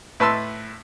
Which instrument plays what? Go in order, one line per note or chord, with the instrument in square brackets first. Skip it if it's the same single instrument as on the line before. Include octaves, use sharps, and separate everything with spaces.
[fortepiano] A2 B4 A5 C6 E6